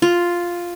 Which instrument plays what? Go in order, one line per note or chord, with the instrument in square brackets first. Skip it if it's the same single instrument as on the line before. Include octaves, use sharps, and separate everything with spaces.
[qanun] F4